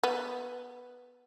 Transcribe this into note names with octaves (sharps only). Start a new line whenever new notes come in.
B3